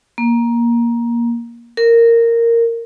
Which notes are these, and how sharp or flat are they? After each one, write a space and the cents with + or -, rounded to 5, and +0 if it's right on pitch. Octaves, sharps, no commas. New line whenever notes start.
A#3 +15
A#4 -10